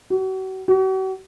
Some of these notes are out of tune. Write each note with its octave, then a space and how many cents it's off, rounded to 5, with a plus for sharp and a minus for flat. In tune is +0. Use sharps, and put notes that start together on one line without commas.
F#4 +40
F#4 +45